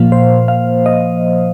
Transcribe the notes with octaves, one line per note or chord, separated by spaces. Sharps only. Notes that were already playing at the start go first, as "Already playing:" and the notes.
Already playing: A#2 F3 A#3 F5
C5
F5
D#5